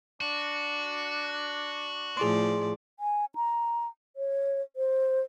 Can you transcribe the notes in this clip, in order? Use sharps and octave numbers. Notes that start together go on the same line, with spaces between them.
D4 F#4
A2 F3 G#4 D5 C6
G#5
A#5
C#5
C5